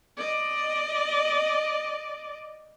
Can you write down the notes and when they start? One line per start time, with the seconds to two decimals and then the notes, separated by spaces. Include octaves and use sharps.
0.17 D5 D#5